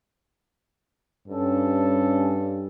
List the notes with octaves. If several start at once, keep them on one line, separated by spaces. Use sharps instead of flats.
G2 C#4 A4